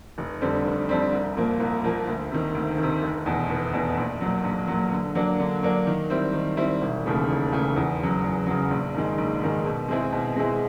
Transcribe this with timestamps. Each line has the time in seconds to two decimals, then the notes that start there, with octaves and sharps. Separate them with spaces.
0.18 F1
0.41 F2 D3 G3 C4
0.65 F1
0.89 F2 D3 G3 C4
1.13 C2
1.37 A#2 F3 A#3
1.60 C2
1.84 A#2 F3 A#3
2.07 D2
2.31 C3 D#3
2.55 D2
2.78 C3 D#3
3.02 F1
3.26 E2 B2
3.50 F1
3.73 E2 B2
3.97 A#1
4.21 A#2 F#3
4.44 A#1
4.68 A#2 F#3
4.92 D3
5.15 F#3 A#3 D4
5.40 D3
5.63 F#3 A#3 D4
5.87 D#3
6.10 G3 C4 E4
6.33 D#3
6.57 G3 C4 E4
6.81 E1
7.06 D#2 C#3 E3 A3
7.29 E1
7.52 D#2 C#3 E3 A3
7.76 E2
8.00 C#3 F#3
8.24 E2
8.46 C#3 F#3
8.71 A#1
8.94 G#2 D#3 G#3
9.18 A#1
9.42 G#2 D#3 G#3
9.66 B2
9.89 G#3 C4 E4 G#4
10.12 B2
10.36 G#3 C4 E4 G#4